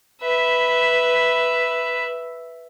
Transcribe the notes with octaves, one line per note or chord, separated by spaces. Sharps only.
B4 E5